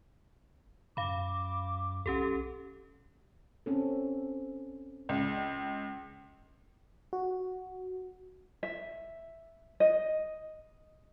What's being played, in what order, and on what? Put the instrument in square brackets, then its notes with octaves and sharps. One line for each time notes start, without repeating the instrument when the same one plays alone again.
[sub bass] F#2 [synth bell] F5 B5 [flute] D6
[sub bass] B1 [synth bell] C#4 G4 A4
[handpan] C4 C#4 A4
[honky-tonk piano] C#2
[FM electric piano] F#4
[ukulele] E5
D#5